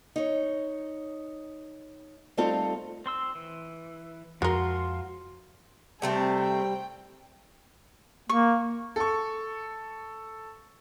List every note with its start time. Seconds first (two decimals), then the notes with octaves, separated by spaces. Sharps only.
0.16 D#4 C#5
2.37 G3 A3 C4 D#4 F4 A4
3.06 C4 C6 E6
3.35 E3
4.42 F2 F3 G#3 F4 F#4 A#4 C6
6.02 C3 G3 A3 C4 A5
6.40 G5
8.29 A#3 C#6
8.96 A4 C#6